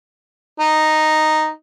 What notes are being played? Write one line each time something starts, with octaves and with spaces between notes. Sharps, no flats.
D#4